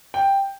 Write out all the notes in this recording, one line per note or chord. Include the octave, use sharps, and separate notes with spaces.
G5